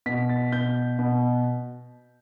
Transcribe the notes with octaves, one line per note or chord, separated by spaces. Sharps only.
B2 B6
A6
B2 G6
B2